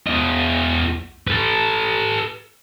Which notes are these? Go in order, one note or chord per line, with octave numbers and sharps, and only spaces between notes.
E2 D#5
A4 B4